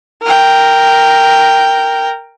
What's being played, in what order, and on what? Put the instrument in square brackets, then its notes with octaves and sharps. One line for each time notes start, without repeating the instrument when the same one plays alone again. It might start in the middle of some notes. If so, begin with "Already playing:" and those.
[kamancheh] A#4 G5